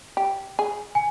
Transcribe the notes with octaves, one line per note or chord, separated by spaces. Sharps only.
G4
G#4
G#5